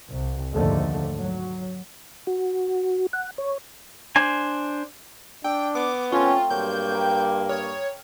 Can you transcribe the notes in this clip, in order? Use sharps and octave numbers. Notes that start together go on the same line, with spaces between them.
C2
D#2 G#2 D3 F3 A3
F#3
F#4
F#5
C#5
D4 C5 G#5
D4 G5 E6
B3 D6
A3 C4 C#4 F4
G2 F#3 A#3 G6
G5 A#5 B5
C#5 F5 D#6